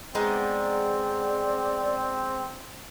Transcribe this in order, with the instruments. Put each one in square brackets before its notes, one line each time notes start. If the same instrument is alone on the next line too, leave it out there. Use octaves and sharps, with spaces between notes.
[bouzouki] G#3 B3 D#4 [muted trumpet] C4 [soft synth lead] D5